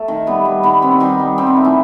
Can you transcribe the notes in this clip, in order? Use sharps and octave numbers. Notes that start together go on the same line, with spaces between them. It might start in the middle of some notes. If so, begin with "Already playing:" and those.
Already playing: A3 A4
D#3
G3 B3 B4
G3
D#3 B3 B4
D#3 C4
B3
D#3 G3 D#4
G3
D#3 C4
B3
A3
E3 E4